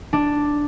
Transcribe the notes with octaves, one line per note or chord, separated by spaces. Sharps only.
D4